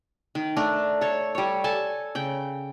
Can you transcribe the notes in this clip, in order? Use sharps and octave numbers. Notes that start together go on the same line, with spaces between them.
D#3
A3 D4 A#4
A4 C#5
G3 C#5
A4 G#5 A5
C#3 G5